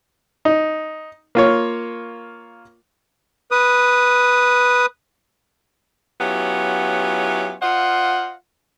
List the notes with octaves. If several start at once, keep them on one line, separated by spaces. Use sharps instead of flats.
D#4
A#3 F4 C#5
B4 D#6
F#3 B3 C#4 E4 F4 G4
F4 C5 D#5 F5 F#5